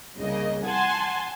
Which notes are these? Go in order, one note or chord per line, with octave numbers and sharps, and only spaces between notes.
C2 C#3 A#3 D#5
F#5 G#5 A5 C6